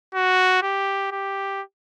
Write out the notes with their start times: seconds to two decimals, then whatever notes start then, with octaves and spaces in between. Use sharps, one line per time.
0.15 F#4
0.62 G4
1.11 G4